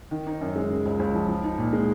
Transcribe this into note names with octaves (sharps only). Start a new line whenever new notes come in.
D#3
D#4
F#2
G#3
C#3
C#2
C#2
F3
F3
D#4
A#2
G#3